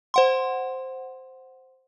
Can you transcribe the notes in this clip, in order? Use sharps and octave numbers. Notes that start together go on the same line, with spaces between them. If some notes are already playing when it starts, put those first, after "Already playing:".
C5 F#5 C6